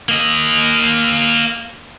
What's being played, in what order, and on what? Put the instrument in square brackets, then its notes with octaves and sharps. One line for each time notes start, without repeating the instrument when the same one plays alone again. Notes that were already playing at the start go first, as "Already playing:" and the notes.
[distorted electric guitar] A#3 D#5